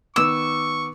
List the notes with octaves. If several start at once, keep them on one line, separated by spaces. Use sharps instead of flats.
D#3 B3 C#6 D6 E6